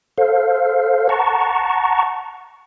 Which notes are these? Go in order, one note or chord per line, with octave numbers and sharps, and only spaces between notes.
A4 C5 F5
F#5 A5 A#5 C#6